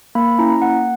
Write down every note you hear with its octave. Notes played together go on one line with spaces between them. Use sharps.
A#3 B5
C#4 E4 A#5
A#3 F#5